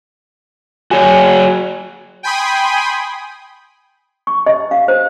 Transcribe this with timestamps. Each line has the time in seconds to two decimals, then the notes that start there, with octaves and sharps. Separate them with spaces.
0.91 F#4 G#4 C#5 G#5
2.23 G5 G#5 B5 C6 D#6
4.27 C#6
4.46 D#5
4.71 F5
4.88 C5